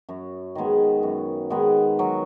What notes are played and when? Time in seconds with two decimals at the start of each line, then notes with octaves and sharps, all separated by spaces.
0.09 F#2
0.55 D#3 G#3 B3
1.03 F#2
1.50 D#3 G#3 B3
1.99 F#3